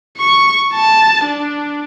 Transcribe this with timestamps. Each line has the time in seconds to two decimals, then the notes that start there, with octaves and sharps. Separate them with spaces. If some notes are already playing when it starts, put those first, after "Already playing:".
0.18 C#6
0.74 A5
1.25 D4